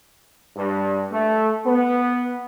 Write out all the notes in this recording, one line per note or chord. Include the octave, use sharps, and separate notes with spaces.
G2
A3
B3